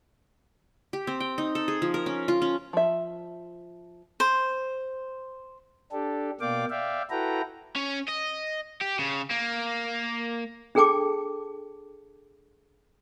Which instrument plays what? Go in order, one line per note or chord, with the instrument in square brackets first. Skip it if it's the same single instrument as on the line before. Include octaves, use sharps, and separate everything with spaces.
[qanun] G4
C4
G5
D#4
A4
G#4
F3
A#4
C#4
F4
C#4
[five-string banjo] F3 E5
[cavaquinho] C5
[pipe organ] D4 G4 A4
B2 A#3 D5 F5 G5 D6
D5 E5 F5 G5
E4 F#4 A4 B4 G5 A#5
[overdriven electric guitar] C#4
D#5
G4
C#3
A#3
[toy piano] D4 G#4 A4 G5 A5 D6